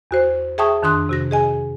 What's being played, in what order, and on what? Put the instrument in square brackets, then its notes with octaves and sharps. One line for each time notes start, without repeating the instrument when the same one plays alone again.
[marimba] E2 F#4 C5
G#4 E5 G5 A5 C#6 D#6
F2 D#3 D4 C6 D#6 F#6
C3 F#4 A#6
G#4 D#5 G#5